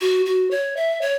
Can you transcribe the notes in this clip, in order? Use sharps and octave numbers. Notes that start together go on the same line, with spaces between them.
F#4
F#4
C#5
E5
C#5